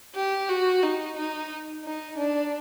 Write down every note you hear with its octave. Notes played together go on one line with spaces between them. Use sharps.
G4
F#4
D#4
D#4
D#4
D4